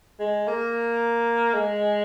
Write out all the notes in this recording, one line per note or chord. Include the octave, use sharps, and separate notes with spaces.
G#3
A#3
G#3